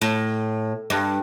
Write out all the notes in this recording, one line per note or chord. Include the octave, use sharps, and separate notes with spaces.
A2
G2